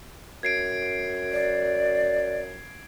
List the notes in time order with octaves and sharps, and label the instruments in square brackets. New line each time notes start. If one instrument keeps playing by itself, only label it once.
[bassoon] F#2 [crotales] G#6 C7 D7
[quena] D5